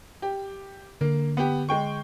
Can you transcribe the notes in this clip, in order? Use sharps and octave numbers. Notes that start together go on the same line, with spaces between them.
G4
D3 A#3
B3 G4
G#3 G5 C#6